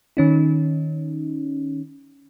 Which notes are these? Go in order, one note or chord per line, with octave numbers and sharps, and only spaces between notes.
D#3 C#4 D#4